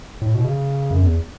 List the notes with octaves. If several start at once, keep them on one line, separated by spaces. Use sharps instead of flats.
A2
B2
C#3
F#2
E2